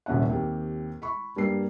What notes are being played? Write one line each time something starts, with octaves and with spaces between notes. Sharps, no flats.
D#1 C2 F#2 A#2 C#4 F#5
D#2 C4 G4
B5 C#6
G2 G3 A#3 C7